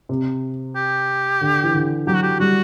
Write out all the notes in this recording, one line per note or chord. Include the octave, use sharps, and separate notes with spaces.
C3
G4
D3
E3
D3
F#3 G4
F#4
G4
G3 F#4